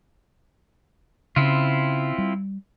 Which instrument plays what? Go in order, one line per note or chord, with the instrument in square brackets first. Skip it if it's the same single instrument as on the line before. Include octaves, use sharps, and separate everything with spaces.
[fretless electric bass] C#3 [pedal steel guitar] C4 E4 F4
[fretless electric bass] G3